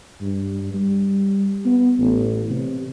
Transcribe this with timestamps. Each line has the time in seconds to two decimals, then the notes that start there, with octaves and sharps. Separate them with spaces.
0.21 G2
0.74 G3
1.65 B3
1.99 A1
2.51 C3